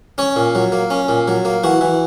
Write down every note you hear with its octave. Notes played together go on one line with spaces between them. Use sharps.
C#4 C#5
A#2
F#3
A#3
C#4
A#2
F#3
A#3
E3 F#4
E3